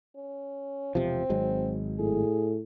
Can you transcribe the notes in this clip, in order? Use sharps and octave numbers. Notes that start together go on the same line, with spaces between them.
C#4
E1 C3 F3 C4
G#1 F#3 G#3
A2 G#4